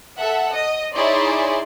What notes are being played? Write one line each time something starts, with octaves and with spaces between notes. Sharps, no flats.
A4 E5 F#5
D#5
D#4 E4 G#4 C#5 D5 C6